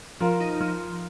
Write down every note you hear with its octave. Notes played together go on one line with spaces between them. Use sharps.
F3 F4 A#4
D#4
F3